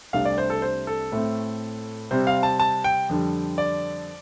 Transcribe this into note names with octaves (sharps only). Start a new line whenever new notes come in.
C2 C3 A3 D4 F5
D5
C5
A4
C5
A4
A2 A3 C4
C3 G3 C4 C5
F5
A5
A5
G5
F2 D3 G3
D5